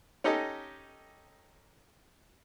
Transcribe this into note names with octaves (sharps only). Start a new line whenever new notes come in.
C#4 D#4 G4 A4 D#5